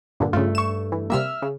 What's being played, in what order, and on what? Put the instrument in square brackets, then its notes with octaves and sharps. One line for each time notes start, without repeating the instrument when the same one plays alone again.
[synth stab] G2 A#2 D3
[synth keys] G2 A3 [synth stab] C#3 F4
[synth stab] C#6 E7
E3
[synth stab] C3 G3 A#3 [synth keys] E5 E6 F6
[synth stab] C#3